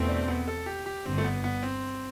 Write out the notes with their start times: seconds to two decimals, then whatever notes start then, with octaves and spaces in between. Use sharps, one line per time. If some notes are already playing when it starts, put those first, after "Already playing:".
Already playing: E2 B2 A3 C4
0.08 D4
0.28 B3
0.48 A4
0.66 G4
0.86 G4
1.05 G1 G2 D3 C4
1.18 A3
1.24 B3
1.44 B3
1.63 C4